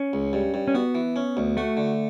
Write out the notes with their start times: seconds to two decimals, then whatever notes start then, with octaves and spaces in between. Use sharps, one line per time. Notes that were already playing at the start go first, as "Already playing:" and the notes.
Already playing: C#4
0.13 C#2
0.33 G2
0.54 G2
0.68 C#4
0.74 B3 F#4
0.95 E3
1.16 C#4
1.37 D2
1.57 A3 F#4
1.77 D3